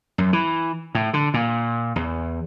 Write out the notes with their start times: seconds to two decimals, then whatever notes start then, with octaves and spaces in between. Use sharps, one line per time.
0.18 F#2
0.33 E3
0.95 A2
1.14 D3
1.34 A#2
1.96 E2